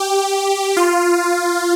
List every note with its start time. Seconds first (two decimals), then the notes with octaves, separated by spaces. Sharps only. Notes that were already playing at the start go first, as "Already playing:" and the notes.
Already playing: G4
0.77 F4